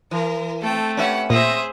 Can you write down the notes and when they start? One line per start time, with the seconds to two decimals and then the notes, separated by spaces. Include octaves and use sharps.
0.11 E3 A#4
0.62 A3 C4 A4 G5
0.97 C#4 G4 B4 E5 F#5
1.30 A#2 C4 G#4 C5 E5 D#6